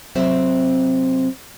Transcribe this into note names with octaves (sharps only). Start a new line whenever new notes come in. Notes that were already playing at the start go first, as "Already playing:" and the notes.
C3 F#3 C4 C5 E5